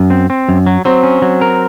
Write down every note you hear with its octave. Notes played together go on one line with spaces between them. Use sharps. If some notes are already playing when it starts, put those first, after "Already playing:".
Already playing: F#2
C4
C4
F#2
F#3
F#3 C4
C#4
F#3
A#4